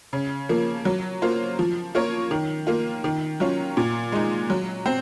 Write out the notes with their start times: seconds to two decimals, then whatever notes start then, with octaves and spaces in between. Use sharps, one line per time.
0.13 C#3
0.49 F3 A#3
0.85 F#3
1.22 A#3 F4 C5
1.59 F3
1.95 A#3 F4 A#4 C#5
2.31 D#3
2.67 A#3 F4
3.04 D#3
3.40 F#3 C#4 F4
3.77 A#2
4.12 G#3 D#4
4.50 F#3
4.86 C4